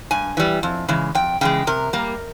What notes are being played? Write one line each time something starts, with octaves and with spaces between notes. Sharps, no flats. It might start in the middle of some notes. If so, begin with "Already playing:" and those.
G2 G#5
E3 G3
F2
C#3 E3 G#3
F2 G5
C#3 E3 G#3 G5
C3 A#4
G3 A#3